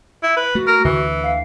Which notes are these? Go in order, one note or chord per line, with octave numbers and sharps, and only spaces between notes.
E4
B4
A3 F#4
A#4
D2 D3 E3
F5